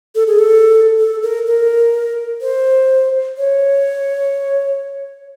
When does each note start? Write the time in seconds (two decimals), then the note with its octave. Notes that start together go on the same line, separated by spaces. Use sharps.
0.15 A4
0.27 G#4
0.39 A4
0.99 A4
1.23 A#4
1.46 A#4
2.42 C5
3.37 C#5